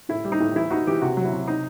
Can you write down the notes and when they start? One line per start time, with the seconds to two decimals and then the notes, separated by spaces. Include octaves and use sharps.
0.09 A2 E4
0.24 G3
0.32 D#4
0.40 A2
0.55 E3 E4
0.70 D#4 F#4
0.87 E3 G4
1.02 C3 F#4
1.17 F#3
1.24 E4
1.33 C3
1.48 D#4